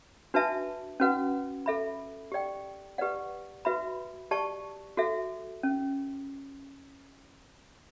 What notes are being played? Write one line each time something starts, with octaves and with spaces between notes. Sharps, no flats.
D4 F#4 B4 E5 A5
C#4 F#4 B4 F#5
A4 E5 B5
G4 D5 G5
G4 B4 D5 F#5
F#4 B4 E5 B5
G4 D5 A5 C#6
F#4 A4 E5
C#4